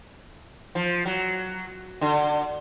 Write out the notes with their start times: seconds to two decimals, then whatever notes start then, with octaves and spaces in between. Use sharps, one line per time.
0.75 F3
1.05 F#3
2.01 D3